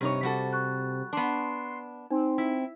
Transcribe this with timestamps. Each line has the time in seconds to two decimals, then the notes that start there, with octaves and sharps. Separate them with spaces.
0.01 G2 C3 D#4 C#5
0.23 G3 F#4 A4
0.53 C#6 F#6
1.13 B3 D4 C6
2.11 C4 D#4
2.38 E4